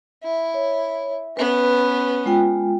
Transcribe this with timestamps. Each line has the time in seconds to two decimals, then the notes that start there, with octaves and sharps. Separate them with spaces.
0.23 E4
0.54 C#5
1.37 B3 C#4 B4
2.26 G#3 F4 G5